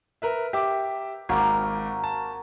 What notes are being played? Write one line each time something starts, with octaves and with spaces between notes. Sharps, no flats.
A#4 B4 E5
G4 E5 D6
G#1 A#3 F#4 D6
A5